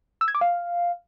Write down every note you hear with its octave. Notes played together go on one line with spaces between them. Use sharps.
E6
G#6
D6
F5